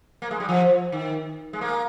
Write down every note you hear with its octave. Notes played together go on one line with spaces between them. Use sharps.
A#3
G#3
G3
F3
D#3
G#3
A#3